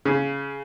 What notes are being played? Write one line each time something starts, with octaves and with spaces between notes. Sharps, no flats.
C#3